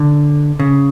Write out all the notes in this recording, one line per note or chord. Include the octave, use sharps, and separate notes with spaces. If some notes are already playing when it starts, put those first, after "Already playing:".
Already playing: D3
C#3